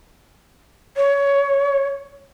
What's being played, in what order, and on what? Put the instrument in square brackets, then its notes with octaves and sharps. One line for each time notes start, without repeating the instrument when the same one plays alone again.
[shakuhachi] C#5